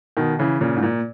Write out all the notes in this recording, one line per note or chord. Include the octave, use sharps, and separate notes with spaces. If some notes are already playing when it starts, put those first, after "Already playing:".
B2 D#3
C#3 E3
A#2 C#3
G#2
A#2